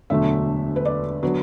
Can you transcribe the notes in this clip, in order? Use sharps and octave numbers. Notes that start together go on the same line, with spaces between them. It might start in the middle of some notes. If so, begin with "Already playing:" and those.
E1 D2 D3 F#3 A3 E5
B4
D5
D3 F#3 B3